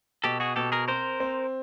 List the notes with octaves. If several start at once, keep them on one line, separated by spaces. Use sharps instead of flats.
B2 G4 A4
F#4 G#4
B2 G4 A4
G#4 A#4
C4 A#4 C5
C4